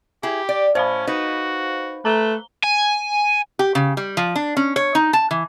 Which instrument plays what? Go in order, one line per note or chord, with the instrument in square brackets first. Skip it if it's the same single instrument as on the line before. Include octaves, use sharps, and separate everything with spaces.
[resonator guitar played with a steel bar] E4 G#4 [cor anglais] G4
[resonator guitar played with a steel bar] D5
[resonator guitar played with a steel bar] A2 [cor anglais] C#4 [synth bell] C5 F5 B5
[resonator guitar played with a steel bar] D#4 B4 [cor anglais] F#4
[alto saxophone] A3 [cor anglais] B4 [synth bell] A#5 G7
[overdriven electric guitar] G#5
[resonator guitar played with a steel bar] G4
C#3
G3
F3
D4
C#4
C#5
D#4
A5
E3